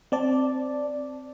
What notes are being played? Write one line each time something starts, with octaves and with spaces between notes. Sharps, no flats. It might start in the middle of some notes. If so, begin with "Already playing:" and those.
C4 D5 A5